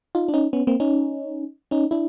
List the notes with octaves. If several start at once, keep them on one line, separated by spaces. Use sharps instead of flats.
D#4 F4
D4
C#4 D#4
B3 C#4
A#3 C4
C#4 D#4
C#4 D#4
D4 E4